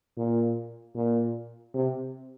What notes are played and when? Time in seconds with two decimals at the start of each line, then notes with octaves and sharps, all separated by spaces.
0.17 A#2
0.95 A#2
1.74 C3